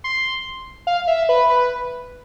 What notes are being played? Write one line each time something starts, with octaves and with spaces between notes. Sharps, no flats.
C6
F5
E5
B4
B4